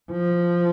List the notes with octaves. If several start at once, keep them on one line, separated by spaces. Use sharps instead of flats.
F3